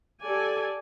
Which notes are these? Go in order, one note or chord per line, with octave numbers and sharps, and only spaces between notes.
G4 A4 D5 G#5